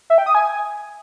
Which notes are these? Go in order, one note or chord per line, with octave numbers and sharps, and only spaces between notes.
E5
G5
D#6
G#5